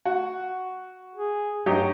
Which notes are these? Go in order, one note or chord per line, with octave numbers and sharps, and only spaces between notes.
F#4
G#4
G2 F#3 D#4 G4